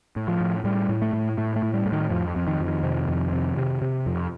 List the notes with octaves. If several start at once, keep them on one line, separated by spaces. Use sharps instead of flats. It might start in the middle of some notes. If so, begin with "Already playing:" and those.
A2
F3
A2
A2 G3
A2
A3
A2
A2 A3
A3
A2
G3
A2
D#3
F2 F3
F2
D#3
F2
D#3
C3
F2
C3
C3
C3
F2